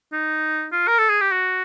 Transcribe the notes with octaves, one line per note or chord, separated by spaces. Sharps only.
D#4
F4
A#4
A4
G#4
G4
F#4